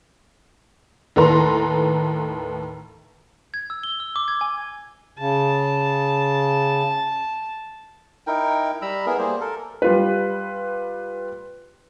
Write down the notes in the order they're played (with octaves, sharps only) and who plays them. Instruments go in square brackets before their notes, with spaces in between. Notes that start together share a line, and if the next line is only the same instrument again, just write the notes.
[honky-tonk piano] D#2 A2 A4 B4 A#5 C6
[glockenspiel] G#6
E6
G7
E6
D6
G#6
G#5
[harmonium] C#3 [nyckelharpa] A5
[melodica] D#4 E4 A#4 G5
G3 A#5 B5 E6
B3 E4 G#4 A#4
G3 A#3 G#4 C5
A4 A#4
[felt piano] G3 F4 B4